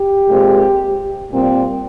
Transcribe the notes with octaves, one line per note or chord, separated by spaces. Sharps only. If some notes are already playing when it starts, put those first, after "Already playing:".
Already playing: G4
A#2 G#3 C4
A#2 G3 C4